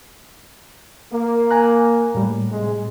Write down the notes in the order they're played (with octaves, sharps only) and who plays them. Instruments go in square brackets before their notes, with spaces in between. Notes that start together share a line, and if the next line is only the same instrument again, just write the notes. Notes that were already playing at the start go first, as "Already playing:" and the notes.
[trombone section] A#3
[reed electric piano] G#5 A#5 F#6
A2 G3
[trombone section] C3 G#3